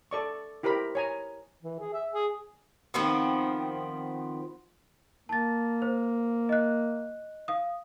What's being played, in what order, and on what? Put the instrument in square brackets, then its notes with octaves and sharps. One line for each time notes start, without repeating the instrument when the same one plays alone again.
[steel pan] A4 D5 C#6
E4 G4 A#4 C5 B5
C#5 G#5 A#5
[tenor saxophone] E3
G#4
E5
G#4
[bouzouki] D#3 F3 B3 C4
[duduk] A#3 [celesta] A5 A6
[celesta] C5
D#5 F#6
F5 D#6